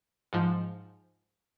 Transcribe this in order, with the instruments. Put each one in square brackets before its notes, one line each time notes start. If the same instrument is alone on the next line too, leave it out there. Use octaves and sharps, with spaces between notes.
[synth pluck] G#2 F3